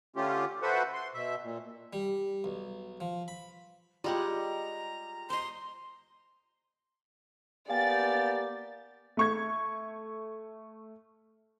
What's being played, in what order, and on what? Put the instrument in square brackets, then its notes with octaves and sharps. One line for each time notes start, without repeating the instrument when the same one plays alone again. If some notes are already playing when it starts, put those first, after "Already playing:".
[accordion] D3 A3 C#4 F4 G4
F#4 A4 B4 C5 E5 F#5
C6
B2 E5
A#2
[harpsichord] G3
B1
F3
B5
[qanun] G3 G#3 F#5 [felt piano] F4 G4 [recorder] A#5
[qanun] C5 D#5 [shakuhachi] C6
[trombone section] A#3 B3 G4 [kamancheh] D5 [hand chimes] F5 G#5 [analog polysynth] A6
[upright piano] A3 C#6 G#6